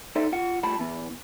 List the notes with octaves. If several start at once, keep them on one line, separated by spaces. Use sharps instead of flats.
D#4 A4 C5 D5 E5
F4 F#5
G3 A3 F4 A5 B5
E3 B3